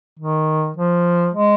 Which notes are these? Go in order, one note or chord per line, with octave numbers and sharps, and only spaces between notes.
D#3
F3
G#3